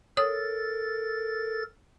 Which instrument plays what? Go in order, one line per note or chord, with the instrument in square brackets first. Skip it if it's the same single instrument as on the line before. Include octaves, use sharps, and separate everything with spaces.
[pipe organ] A4 A#4 A6 [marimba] C#5 D#6